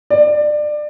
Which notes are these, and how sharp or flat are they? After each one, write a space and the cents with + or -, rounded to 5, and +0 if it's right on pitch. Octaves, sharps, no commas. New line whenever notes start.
D5 +25